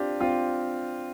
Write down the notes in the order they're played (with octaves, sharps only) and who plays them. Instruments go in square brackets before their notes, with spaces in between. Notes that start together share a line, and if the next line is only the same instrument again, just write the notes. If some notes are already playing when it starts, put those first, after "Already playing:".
Already playing: [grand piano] C4 D4 F4 G4
C4 F4